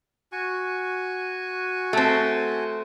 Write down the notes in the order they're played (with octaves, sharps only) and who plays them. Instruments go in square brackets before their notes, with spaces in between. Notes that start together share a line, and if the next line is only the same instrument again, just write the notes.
[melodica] F#4 G#5 C#6
[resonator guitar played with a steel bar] A3 C4